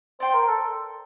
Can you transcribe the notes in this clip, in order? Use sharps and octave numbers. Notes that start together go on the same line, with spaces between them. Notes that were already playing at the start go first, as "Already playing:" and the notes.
C5 D5 G5 C6
A#4
A4